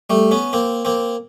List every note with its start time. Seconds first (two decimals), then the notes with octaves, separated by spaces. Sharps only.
0.10 G3 A3
0.31 B3 C#4
0.53 A#3 C4
0.85 A#3 C4